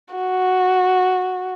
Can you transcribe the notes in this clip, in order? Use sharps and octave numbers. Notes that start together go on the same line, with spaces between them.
F#4